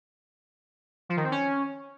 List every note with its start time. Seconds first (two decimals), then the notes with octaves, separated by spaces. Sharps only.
1.09 F3
1.17 D#3
1.24 C4
1.31 C#4